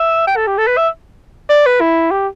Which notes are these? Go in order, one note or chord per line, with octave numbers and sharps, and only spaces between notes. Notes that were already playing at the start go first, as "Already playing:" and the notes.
Already playing: E5
G5
A4
G4
A4
B4
E5
D5
B4
E4
G4